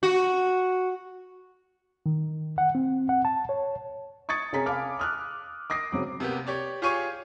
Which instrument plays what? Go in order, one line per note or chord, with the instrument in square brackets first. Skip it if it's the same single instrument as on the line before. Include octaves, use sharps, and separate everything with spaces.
[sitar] F#4
[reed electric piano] D#3
F#5
C4
F#5
A5
C#5
[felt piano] C#6 D#6 G#6 A6 C#7
C3 C#4 G#4 A#5 B6
F5 G#5 A5 B5 D6 F6
D#6 F6 F#6
D6 D#6 A#6 C7 D7
C#3 F#3 C4
[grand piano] C3 A#3 B3 G4
G4 C#5 D5
F4 G4 G#4 C#5 C#6 D#7